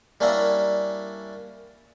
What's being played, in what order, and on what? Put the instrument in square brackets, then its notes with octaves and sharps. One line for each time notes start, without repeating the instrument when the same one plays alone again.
[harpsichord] G3 A#3 C#4 D4 E4 A#5